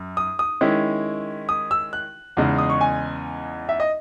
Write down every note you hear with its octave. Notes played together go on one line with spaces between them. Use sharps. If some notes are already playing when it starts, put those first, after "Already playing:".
Already playing: F#2
D#6
D#6
D#3 G#3 C#4 E4
D#6
E6
F#6
E2 C#3 G#3 D#4
D#6
C#6
G#5
E5
D#5